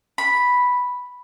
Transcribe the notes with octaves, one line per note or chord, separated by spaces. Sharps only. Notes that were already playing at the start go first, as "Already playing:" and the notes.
B5